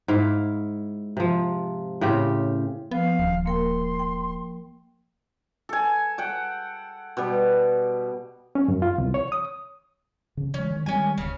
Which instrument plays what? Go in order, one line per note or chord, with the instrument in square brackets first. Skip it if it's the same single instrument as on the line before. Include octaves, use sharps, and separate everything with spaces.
[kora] G#2 E4 F5
C3 F3
A2 C#3 C4 G4
[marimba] F3 [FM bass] B3 [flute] F5
[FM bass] D#1
[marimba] A#3 A#4 G5 [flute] C6
[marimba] G5
[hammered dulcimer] A4 G#5
F#5 G5
B2 G3
[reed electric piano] C#4
F#2
F4
C2
C#5
D#6
[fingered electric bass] C#3
[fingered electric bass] E3 G#3 [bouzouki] C#4
[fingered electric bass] D#3
[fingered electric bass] D#3 G3 G#3 [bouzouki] C#4 G#5
[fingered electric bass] D1 [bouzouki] C#3 C#4